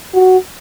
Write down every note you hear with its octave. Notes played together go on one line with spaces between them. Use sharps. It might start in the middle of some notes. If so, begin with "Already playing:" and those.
F#4